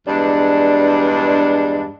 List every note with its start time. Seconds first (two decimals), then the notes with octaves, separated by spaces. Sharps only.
0.08 E2 G2 G#3 D4